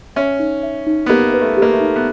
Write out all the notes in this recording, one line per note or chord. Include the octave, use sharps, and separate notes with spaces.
C#4 E5
D#4
E5
D#4
B3
A#3 G4
B4
A3
G4
A#3
A3
D#4
B3